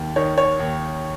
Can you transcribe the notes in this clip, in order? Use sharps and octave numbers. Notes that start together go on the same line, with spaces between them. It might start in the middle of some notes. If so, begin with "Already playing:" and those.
Already playing: D#2
D#3 C#5
C#5
D#2